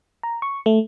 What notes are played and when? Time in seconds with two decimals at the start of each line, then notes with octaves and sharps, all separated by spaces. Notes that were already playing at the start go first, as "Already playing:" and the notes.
0.23 A#5
0.42 C#6
0.66 A3